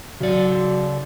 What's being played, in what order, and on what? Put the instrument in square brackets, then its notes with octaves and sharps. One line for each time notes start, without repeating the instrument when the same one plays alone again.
[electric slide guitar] C#3 D5 [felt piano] F#3